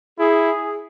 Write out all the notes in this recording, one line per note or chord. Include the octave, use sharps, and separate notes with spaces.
E4 G#4